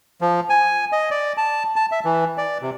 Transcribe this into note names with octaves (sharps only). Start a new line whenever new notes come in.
F3
G#5
D#5
D5
A5
A5
E5
E3
D5
C3